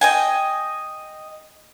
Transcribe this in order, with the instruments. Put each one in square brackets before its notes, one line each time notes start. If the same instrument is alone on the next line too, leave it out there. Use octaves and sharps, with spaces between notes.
[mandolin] D#5 G5 G#5